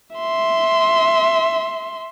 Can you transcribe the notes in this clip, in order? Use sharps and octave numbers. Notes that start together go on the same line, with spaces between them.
E5 C6